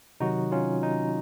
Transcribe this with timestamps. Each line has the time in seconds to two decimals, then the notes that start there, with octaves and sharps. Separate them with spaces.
0.20 C3 D#3 F#3 D#4 F#4
0.52 C#4 F4
0.83 D#4